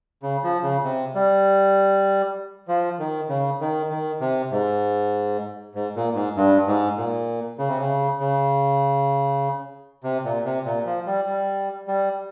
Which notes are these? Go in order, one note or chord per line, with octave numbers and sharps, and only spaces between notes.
C#3
F3
C#3
C3
G3
F3
D#3
C#3
D#3
D#3
C3
G#2
G#2
A#2
G#2
G2
G#2
A#2
C#3
C3
C#3
C#3
C3
A#2
C3
A#2
F3
G3
G3
G3